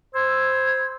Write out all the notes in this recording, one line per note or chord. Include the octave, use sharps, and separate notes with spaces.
C5 B5 E6 G#6